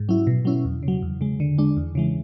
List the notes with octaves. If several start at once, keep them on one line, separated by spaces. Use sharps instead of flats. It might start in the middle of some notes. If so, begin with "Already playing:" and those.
Already playing: G#2
F#3 C#4 E4
B2
F#3 C#4 E4
E2
C#3
F#3
E2
C#3 G#3
D3
G#3 D4
E2
C#3 E3 G#3